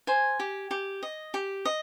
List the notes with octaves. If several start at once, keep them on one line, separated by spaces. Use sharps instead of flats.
C5 G#5
G4
G4
D#5
G4
D#5